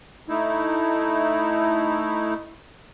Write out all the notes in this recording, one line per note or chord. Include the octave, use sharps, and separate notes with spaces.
A3 D#4 E4